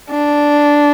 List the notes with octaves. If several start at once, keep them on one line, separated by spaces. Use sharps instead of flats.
D4